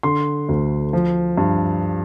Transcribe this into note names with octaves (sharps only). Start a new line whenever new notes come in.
D3 C6
D2
F3
G2